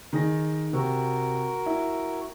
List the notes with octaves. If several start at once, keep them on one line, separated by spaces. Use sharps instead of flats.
D#3 G#4 A#6
C3 F#4 A#4
E4